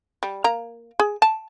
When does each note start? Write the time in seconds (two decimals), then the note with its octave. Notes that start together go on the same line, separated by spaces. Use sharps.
0.23 G3
0.44 A#3 A#5
0.99 G#4
1.22 A5